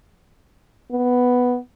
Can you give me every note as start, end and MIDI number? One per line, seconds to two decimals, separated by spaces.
0.91 1.57 59